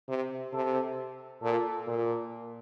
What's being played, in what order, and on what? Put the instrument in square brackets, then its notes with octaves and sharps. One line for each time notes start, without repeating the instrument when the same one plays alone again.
[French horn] C3
[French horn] C3 [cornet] A4
[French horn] A#2 [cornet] A4
[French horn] A#2